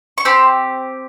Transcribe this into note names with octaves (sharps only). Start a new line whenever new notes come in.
C#6
C4 G4 C6